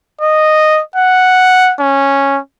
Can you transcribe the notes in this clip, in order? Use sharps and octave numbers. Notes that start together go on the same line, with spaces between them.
D#5
F#5
C#4